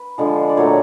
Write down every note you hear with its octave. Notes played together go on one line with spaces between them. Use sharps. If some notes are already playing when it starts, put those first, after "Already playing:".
Already playing: B4
D3 F3 G#3
D5
A#2 F#3 A3 C#5